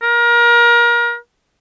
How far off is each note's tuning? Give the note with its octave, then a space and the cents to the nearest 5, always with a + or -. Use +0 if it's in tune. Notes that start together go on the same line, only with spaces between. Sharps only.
A#4 +30